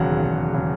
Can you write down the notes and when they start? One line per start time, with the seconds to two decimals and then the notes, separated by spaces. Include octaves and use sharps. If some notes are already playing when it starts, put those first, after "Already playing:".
Already playing: E1 D#2 C#3 F#3 F#5
0.20 E1
0.54 C#3 F#3